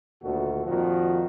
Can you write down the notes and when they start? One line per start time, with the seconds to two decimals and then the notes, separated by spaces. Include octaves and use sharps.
0.23 D2 A#2 D#3 F#4 A4
0.65 F2 A#2 D#3 F3 F#4